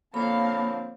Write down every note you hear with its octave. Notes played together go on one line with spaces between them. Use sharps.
D3 F3 A#3 C4 C#5 F5 A5 B5